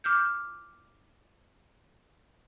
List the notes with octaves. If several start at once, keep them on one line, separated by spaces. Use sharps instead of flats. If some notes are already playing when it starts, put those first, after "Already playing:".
D6 F6 G6